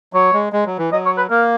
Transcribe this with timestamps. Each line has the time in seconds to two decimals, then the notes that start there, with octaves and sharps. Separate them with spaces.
0.13 F#3 C#5
0.34 G#3
0.53 G#3
0.66 F#3
0.78 E3
0.92 F#3 D#5
1.05 C#5
1.17 B4
1.30 A#3 A#4